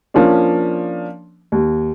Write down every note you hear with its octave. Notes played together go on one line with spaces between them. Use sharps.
F3 A#3 C#4 D4
D#2